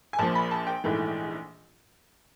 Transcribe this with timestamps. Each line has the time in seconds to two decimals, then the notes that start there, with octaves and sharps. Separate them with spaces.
0.13 G#5
0.19 A#1 A#2 F3 A5
0.35 B5
0.51 A5
0.67 G5
0.84 A#1 G#2 E3 A3